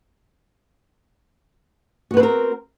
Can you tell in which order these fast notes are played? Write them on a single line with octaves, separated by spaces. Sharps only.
F#4 B3 B4 C4 A#4